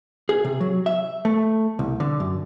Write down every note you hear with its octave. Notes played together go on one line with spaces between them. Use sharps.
G#4
C3
F#3
E5
A3
C2
D3
F#2